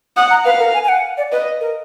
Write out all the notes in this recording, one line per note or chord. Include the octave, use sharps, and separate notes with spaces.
F#5 D#6
A#5
B4 F5
A#4
G#5
G#5
F#5
D5
B4 D#5
A#4